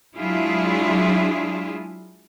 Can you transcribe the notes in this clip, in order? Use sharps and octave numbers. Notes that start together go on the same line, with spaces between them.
F#3 G#3 D4 E4 F4 G#4